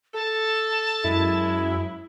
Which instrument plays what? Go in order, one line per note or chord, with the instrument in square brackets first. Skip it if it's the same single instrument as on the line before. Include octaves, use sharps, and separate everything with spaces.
[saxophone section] A4 [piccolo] A5
[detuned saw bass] F#2 [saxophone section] G#3 [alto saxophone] E4